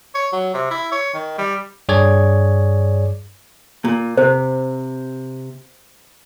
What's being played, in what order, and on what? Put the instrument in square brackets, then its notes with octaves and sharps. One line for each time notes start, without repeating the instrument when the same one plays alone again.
[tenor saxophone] C#5
F#3
C3
E4
C#5
D#3
G3
[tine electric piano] G2 G#4 C#5 D5 G#6
[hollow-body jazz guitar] A#2
[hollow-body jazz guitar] C3 [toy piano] C5